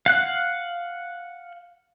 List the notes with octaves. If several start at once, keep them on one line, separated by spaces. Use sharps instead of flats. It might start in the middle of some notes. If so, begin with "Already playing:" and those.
F5 F#5 F#6